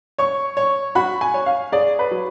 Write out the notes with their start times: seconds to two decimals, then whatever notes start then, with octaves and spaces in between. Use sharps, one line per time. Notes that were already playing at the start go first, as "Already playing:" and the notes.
0.18 C#5 C#6
0.57 C#5
0.95 F#4 B5
1.21 G#5
1.34 C#5
1.46 F5
1.72 G#4 D5
1.99 B4
2.11 F#3